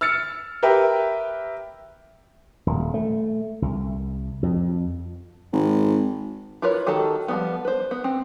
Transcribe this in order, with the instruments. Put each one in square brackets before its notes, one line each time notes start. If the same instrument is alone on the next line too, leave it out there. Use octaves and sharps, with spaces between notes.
[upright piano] E6 F6 A6 C#7
G4 A#4 B4 E5 G5
[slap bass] D#1
A3
C2
F2
[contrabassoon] G#1
[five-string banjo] E4 F4 A#4 B4 C#5
D#3 F#4 G4 A4 A5
F3 G3 B3
B4 C5
B3
C4